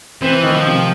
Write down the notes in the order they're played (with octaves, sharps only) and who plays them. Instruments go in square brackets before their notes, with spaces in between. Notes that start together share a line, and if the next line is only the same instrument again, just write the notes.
[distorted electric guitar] E3 [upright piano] C4
[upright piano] D#3
[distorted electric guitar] F3
[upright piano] C3